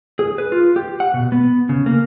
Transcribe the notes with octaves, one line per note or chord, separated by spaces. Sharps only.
G#4
B4
F4
G4
F#5
B2
B3
C#3
A#3